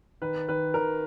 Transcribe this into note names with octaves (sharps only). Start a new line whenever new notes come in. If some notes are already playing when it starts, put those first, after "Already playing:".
D#3 B4
D#3 B4
D#3 A#4